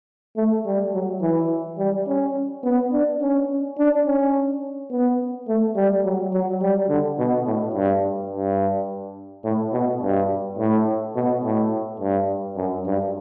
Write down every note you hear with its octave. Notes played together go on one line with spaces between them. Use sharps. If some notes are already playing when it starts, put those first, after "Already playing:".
A3
G3
F#3
E3
G3
C#4
B3
D4
C#4
D4
C#4
B3
A3
G3
F#3
F#3
G3
D3
B2
A2
G2
G2
A2
B2
G2
A2
B2
A2
G2
F#2
G2